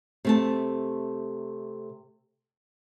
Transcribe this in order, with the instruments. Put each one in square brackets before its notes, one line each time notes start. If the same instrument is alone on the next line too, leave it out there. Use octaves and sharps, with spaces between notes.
[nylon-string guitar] C3 A3 A5